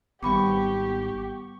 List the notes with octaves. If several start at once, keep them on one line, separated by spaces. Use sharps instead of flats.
G#1 G3 B3 G4 B5 C#6 D6